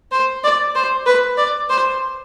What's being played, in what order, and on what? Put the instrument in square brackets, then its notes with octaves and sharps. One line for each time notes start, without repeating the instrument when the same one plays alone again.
[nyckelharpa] C5
D5
C5
B4
D5
C5